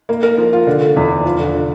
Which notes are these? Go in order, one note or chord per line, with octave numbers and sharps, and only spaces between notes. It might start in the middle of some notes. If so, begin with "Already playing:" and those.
A#3
A#4
F3
F4
D3
A3
E2
F3
F3
D3
D3